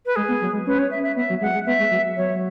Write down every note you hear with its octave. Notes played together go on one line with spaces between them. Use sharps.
B4
G#3 G#4
B3
F#3
G#3
C#4 B4
C#5
E5
E5
B3 E5
F#3
G#3 F#5
G#3
B3 E5
G#3
F#3
F#3 C#5